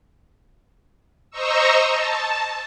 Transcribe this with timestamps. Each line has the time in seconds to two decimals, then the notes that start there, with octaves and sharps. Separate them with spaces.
1.31 C5 D#5 A#5 C#6 E6
1.91 A5